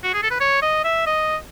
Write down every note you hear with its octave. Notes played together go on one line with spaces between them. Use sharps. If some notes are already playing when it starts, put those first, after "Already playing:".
F#4
G#4
A4
B4
C#5
D#5
E5
D#5